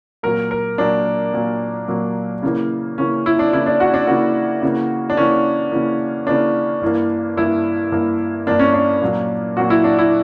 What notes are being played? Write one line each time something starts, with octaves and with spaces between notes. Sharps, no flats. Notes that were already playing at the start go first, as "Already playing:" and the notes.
A#2 F#3 A#3 A#4
A#4
A#2 F#3 A#3 D4
A#2 F#3 A#3
A#2 F#3 A#3
C#3 E3 A#3
C#3 E3 A#3 C#4
E4
D4
C#3 E3 A#3 E4
D4
F#4
D4
C#3 E3 A#3 F#4
C#3 E3 A#3
D4
C#3 E3 A#3 C#4
C#3 E3 A#3
C#3 E3 A#3 D4
G2 E3 A#3
G2 E3 A#3 E4
G2 E3 A#3
G2 E3 A#3 D4
C#4
D4
A#2 F#3 A#3
A#2 F#3 A#3 F#4
E4
D4
E4